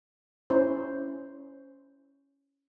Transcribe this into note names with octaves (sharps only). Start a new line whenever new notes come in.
C#4 E4 C5